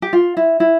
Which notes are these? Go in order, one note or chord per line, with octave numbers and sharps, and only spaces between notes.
G4
F4
E4
E4